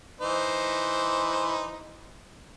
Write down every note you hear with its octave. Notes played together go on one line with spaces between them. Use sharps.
E3 D#4 C5